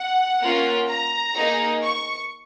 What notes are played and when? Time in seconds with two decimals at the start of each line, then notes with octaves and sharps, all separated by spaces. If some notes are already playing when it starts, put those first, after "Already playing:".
Already playing: F#5
0.41 A#3 C#4 F4
0.89 A#5
1.36 A#3 D#4 G#4
1.83 C#6